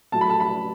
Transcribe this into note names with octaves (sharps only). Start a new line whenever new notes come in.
A2 F#3 A3 A5
B5
A5
B5